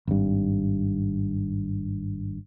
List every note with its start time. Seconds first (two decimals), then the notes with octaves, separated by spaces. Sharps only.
0.07 G#1 G2